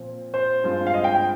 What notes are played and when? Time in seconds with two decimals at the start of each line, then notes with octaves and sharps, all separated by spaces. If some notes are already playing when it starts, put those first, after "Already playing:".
Already playing: A#2 F3 C4
0.34 C5
0.64 G2 F3 G#3 C4 F4
0.87 F5
0.94 D#5
1.04 G5
1.15 G5